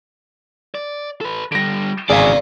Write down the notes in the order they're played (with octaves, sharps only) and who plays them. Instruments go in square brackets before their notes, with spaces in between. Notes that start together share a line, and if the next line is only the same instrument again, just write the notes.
[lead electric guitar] D5
A4 B4
[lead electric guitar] D3 G3 [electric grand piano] A#6 D7
[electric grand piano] G#1 G#4 [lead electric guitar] E2 C#3 [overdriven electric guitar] D5 F5